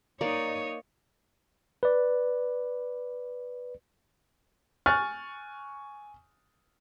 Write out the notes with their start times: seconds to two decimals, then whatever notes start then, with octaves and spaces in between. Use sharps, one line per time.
0.21 A#3 D#4 C#5 D5
1.83 B4 D5
4.86 G#5 C#6 F6 F#6 A6